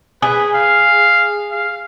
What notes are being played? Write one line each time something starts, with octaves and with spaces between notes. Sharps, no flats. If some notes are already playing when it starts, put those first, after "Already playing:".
G#4 B4
F5
F5